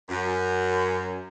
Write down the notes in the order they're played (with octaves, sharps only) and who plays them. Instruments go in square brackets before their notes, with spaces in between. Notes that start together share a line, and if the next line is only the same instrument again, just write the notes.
[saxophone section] F#2